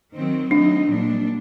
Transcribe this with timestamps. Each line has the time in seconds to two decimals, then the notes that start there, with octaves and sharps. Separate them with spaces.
0.15 D#3 F#3 C4
0.51 F#3 A3 C4 D4 D#4
0.88 A#2 G3 D4